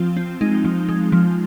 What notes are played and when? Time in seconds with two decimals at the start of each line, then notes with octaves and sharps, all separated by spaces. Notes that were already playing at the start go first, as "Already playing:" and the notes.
Already playing: F3 C4 F4
0.17 C4
0.41 G#3 D#4
0.65 F3
0.89 G#3
1.12 F3